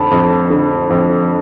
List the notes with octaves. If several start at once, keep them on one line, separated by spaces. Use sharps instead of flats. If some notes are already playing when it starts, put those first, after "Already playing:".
Already playing: F2 D3 A5 B5
F2
D3
F2